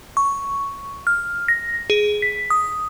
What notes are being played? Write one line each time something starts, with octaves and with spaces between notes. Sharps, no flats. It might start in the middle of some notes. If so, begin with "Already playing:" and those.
C#6
F6
A#6
G#4
B6
D#6